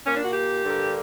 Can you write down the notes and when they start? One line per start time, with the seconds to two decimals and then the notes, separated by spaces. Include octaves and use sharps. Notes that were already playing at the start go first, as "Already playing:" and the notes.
0.05 A#2 A#3 C#4
0.15 D4
0.24 F#4
0.33 G4
0.62 G2 D3 A#3